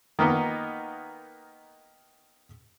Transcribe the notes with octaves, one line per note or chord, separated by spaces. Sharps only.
D#3 A#3 B3 D#4